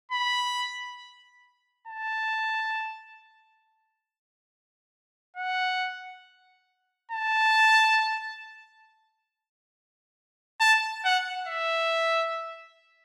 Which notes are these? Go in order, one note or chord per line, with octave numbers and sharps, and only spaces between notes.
B5
A5
F#5
A5
A5
F#5
E5